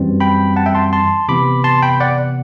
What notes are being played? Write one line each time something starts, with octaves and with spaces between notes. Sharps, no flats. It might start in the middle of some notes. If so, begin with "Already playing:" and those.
Already playing: F#2 E3 G3 C4
G5 B5
F#5 A5
E5 G5
A5 C6
A5 C6
C3 E3 B3 B5 D6
A5 C6
G5 B5
D5 F#5